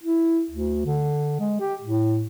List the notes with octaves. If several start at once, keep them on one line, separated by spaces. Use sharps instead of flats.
E4
D2
D3
G#3
G4
A2